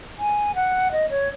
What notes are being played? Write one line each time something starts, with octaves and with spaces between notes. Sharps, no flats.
G#5
F#5
D#5
C#5